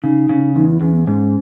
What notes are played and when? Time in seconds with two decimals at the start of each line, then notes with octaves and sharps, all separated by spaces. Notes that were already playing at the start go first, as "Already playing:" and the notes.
0.03 C#3 D#4
0.29 C#3
0.55 E2 D#4
0.68 E4
0.81 E2 C#4
0.94 B3
1.07 G#2 C#4